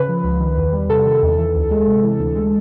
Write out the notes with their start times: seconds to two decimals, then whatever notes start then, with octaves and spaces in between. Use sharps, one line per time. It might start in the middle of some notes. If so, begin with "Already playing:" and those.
Already playing: C#3 B4
0.08 F3
0.24 C#2
0.40 D#3
0.57 E2
0.73 G3
0.89 C3 A4
1.06 D#3
1.22 E2
1.37 E3
1.54 D2
1.71 G#3
1.87 C3
2.02 E3
2.19 D2
2.35 G#3